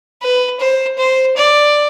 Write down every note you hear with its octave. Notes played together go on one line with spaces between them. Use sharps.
B4
C5
C5
D5